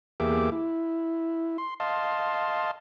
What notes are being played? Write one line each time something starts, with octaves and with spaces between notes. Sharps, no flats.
E2 A#3 G4 G#4 E5 D6
E4
C6
D#5 F5 A5 C6